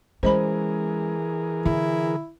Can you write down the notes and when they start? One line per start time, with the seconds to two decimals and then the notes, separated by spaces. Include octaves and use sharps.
0.23 E3 G#3 C#4 G#4 A#4 C5 D#5 B5
1.65 D3 E4